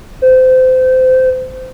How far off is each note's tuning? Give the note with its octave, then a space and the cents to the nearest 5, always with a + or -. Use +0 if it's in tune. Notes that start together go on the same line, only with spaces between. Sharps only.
C5 -25